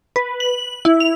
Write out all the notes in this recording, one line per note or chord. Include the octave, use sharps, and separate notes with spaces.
B4
F#7
E4
F7